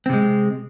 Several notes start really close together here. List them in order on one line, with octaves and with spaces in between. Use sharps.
C4 C3 G#3